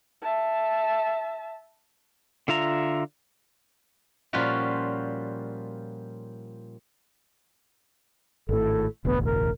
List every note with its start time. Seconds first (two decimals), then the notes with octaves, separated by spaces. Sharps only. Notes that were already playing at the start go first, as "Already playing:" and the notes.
0.22 E5 A5
2.48 D3 F4 E5 A#5
4.33 A#2 F3 G3 C#4 F4 F#4
8.49 G#1 A2 A4
9.05 E1 A1 D2 B3
9.25 A#4